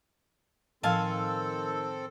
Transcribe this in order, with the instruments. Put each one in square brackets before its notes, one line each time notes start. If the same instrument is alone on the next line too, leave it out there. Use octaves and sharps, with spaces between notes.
[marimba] A2 F3 [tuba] D#3 [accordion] C4 A4 [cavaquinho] F5 G#5 A5